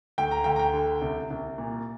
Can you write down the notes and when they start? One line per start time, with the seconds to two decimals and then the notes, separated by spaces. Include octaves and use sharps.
0.18 D2 G5
0.31 A#5
0.44 D2 G5
0.56 A#5
0.59 G5
0.73 D3
1.02 C2
1.31 C2
1.58 A#2